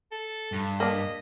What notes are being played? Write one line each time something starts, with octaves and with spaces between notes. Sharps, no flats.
A4
G2
A#3 D4 D#5